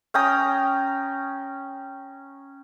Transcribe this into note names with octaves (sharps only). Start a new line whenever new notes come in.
C#4 G5 A#5 D#6